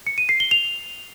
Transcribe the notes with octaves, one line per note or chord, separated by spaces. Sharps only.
C#7
D#7
C7
G7
F7